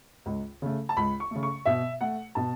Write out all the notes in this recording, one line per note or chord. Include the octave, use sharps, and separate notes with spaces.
C#2
C#3 A3
A5
C#2 B5
C#6
C#3 A3
C#6
B2 E5
A3 F#5
B2 A5